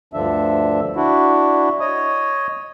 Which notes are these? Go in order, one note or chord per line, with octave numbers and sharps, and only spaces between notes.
D2 G2 D3 F3 D4 E5
D4 E4 F#4
C#5 D#5 D#6